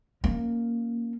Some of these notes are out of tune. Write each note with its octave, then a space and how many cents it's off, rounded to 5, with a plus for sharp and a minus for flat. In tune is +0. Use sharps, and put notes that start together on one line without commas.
A#3 +0 C#4 +0